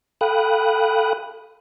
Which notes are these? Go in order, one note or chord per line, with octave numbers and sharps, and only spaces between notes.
A4 F5 G5 B5 D#6 F#6